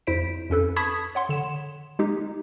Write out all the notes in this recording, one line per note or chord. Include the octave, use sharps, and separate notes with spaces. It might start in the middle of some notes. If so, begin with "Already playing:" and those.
F2 E4 C5 B6 D7
F2 C#4 A4 B4
A5 B5 C#6 D#6 G#6 B6
C#5 F#5 C6
D3 E7
G#3 D#4 G4